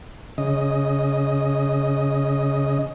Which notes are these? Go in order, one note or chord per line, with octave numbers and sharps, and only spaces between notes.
C#3 D#5